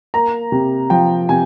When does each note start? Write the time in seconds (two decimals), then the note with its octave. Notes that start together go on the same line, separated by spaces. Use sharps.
0.14 A#3 A#5
0.52 C3
0.90 F3 G5
1.29 C3 G#5